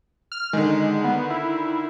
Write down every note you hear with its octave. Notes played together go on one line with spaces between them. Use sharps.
F6
D3 D#3 G#3
B3
E4